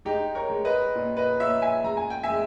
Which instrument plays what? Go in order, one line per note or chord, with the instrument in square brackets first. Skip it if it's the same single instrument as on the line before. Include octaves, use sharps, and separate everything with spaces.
[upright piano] G#3 D#4 G4
A#4 C#5
G#3
B4 D#5
A#2
B4 D#5
A#2 C#5 E5
E5 G#5
G#3 A#5
G#5
G5
E5 G#5
G#3